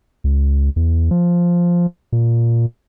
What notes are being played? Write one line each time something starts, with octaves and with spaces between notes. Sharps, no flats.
C#2
E2
F3
A#2